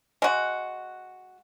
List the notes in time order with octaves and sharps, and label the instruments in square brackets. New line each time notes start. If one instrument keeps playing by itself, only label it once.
[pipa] G#3 F#4